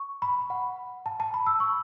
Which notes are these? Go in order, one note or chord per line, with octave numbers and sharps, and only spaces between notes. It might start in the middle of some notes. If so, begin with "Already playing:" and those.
Already playing: C#6
B5
F#5
A5
A5
B5
E6
C#6